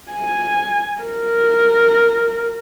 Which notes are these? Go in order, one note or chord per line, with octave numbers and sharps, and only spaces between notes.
G#5
A#4